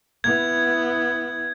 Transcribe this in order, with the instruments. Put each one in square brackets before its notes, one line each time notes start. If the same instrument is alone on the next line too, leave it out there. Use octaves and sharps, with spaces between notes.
[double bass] B3 E4 [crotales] G#6